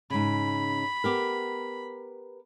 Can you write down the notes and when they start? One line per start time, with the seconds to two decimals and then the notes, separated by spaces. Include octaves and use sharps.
0.10 G#2 C#3 B5
1.04 B3 G4 A#4